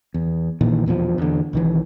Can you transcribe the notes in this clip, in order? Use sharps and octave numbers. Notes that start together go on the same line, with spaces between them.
E2
A#1 A#2 D#3 E3
E2 B2 D3 F3
E2 D3
B1 D#3 E3